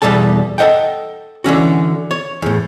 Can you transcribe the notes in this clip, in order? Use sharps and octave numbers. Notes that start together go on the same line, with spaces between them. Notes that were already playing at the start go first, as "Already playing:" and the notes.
E2 B2 G3 A4 A5
A4 A#4 D#5 F#5 G5
D3 E3 C#4 F#4
C#5
E2 A2